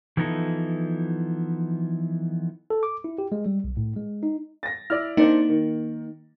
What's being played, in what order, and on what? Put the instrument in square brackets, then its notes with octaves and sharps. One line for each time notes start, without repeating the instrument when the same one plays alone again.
[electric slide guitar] E3 F3 B3 D#4 E4 A4
[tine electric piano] A4
D6
E4
G4
G#3
G3
B1
A2
G#3
D#4
[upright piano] A6 A#6
[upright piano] E4 D5 [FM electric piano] F6
[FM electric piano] A#3 D#4 [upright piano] C4 D4 C5
[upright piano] D#3